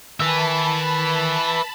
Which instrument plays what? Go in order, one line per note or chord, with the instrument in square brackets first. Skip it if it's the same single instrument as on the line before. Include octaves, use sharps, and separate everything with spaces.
[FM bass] D#3 [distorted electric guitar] B4 E5 [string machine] A5 B5